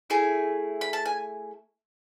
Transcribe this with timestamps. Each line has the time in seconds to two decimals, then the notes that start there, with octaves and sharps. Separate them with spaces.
0.10 A3 E4 G#4 G#5
0.81 B5
0.93 A5
1.06 G#5